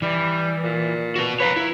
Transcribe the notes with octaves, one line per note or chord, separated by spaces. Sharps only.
E3 G3
A#2
F#4 B4
B4 C#5 F5 A#5
E4